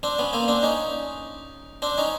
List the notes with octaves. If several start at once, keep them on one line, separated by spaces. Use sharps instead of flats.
C4 D4
B3 C#4
A#3 C4
C4 D4
C#4 D#4
C4 D4
C#4 D#4